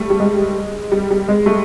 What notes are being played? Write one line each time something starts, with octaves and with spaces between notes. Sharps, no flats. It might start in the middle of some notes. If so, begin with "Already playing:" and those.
Already playing: G3 A3
G3
G#3
G3
G3
G#3
G3 A3